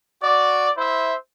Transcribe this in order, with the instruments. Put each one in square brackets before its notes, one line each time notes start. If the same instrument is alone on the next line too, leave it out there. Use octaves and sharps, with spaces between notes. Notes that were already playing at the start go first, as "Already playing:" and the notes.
[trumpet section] F#4 D5
E4 C5 E5